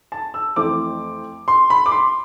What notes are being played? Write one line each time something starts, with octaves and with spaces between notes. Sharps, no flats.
A5
E6
F2 E3 A3 C4 D6
C6
B5
D6
C6